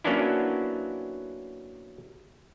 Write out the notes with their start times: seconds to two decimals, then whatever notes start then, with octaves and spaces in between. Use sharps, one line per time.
0.04 F#3 A#3 B3 C#4 D4 E4